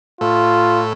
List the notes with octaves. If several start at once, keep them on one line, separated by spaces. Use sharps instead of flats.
A2 F4